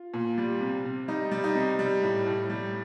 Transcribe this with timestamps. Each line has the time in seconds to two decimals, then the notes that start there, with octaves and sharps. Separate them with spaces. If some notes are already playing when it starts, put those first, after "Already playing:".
Already playing: F4
0.14 A#2
0.38 G3
0.61 C3
0.85 C3
1.08 G3 D#4
1.32 G3
1.44 D#4
1.55 C3
1.79 G3
2.02 A2
2.26 A2
2.50 G3